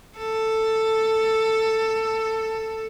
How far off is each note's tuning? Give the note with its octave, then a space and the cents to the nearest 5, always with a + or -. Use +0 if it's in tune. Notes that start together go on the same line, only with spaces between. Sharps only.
A4 +10